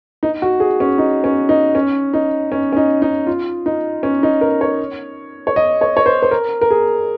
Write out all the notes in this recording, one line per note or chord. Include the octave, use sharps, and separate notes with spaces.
D#4
F#4
G#4
C#4
D#4
C#4
D#4
C#4
D#4
C#4
C#4
D#4
D#4
F4
D#4
C#4
D#4
A#4
C#5
C#5
D#5
C#5
C#5
C5
C5
A#4
A#4
G#4